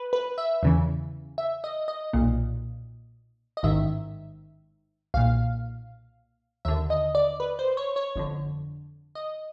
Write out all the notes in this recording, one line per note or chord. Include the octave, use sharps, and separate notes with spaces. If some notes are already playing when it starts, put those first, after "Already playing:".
Already playing: B4
B4
E5
E2 C#3 E3
E5
D#5
D#5
B1 A#2
D#5
A1 G#2 D#3 E5
B1 A#2 F5
D#2 D3 E5
D#5
D5
B4
C5
C#5
C#5
G1 F2 D3
D#5